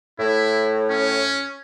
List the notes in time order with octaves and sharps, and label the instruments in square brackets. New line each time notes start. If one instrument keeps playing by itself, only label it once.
[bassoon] A2 [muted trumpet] E4
[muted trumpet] C#4